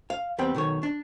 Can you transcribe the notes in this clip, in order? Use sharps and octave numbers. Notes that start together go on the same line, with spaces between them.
F5
E2 G3 B3 C4 G5
B1 D#3 A4 C#5
D4